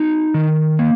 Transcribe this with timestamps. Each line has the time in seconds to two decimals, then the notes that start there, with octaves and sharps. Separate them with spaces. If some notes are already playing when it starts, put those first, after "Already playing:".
Already playing: D#4 F#4
0.34 D#3
0.79 A#3